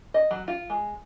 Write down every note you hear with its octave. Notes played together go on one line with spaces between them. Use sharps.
D#5
F#3
F4
G#3